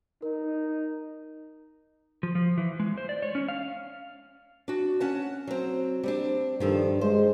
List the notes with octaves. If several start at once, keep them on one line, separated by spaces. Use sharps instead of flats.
D#4 A#4
F3
F3
E3
G#3
C5
D5
C#5
C#4
F5
D4 F#4
C#4 F#5 A5
F#3 C4
G3 C4 D4
G2 D#3 F3 A4
G#3 C5